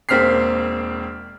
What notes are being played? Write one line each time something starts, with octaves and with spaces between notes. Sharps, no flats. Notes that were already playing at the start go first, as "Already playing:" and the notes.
E1 A#3 C4 F6 B6 C7